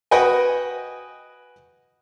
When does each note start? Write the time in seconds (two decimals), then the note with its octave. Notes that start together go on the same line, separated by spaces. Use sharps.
0.11 F#4 B4 D#5 G5 G#5